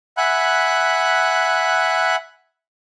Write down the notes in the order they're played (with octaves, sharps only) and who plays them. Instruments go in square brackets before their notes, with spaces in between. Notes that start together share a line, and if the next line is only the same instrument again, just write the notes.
[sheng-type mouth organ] E5 F#5 G#5 B5 F#6